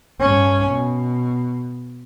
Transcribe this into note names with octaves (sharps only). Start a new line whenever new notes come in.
G2 C#4
B2